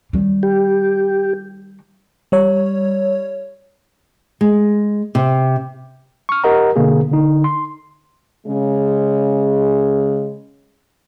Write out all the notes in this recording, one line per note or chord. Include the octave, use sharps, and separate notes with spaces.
D#3 G3
G4
G3 C#5
G#3
C3
C#6 F6
G4 A#4 D#5 F#5 A#5
B2 D3 A#3 G#4
D3 D#4
C6
C#3 G#3